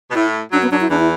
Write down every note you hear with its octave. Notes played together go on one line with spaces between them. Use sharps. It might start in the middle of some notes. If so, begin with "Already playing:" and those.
B2
A2 E4
F#2 F#3 D4
B3
F#2 F#3 D4
E4
E2 E3 D4
E4